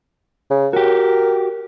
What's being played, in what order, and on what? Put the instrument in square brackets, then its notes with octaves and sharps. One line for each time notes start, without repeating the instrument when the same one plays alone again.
[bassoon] C#3
[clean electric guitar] F#4 G4 [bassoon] A#4